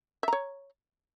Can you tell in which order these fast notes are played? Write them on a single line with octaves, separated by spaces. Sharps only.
E5 A#5 C#5